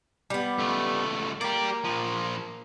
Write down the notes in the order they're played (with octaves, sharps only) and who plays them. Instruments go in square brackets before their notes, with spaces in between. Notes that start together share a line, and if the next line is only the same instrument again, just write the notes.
[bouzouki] G3 B3
[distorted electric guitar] C#2 A3
[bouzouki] A#3 [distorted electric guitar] G4 D5
[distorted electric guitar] A#2 F3